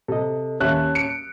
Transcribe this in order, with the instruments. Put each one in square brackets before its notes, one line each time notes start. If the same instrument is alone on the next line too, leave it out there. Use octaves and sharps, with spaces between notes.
[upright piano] C3 [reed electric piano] A4 D#5
[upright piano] D#2 E5 F#6 [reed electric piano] C#4 C#5 A5
[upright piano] C#7 D7